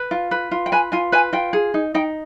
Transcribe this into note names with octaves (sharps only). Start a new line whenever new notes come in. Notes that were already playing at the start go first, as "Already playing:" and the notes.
Already playing: B4
F4
B4
F4
G5
B4 G#5
F4 G#5
B4 G#5
F4 G5
G#4
D#4
D#4 G5